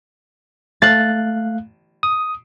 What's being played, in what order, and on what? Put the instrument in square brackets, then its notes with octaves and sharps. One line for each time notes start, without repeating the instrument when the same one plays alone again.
[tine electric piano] A3 F5 F#6 [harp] A6
[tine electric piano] D#6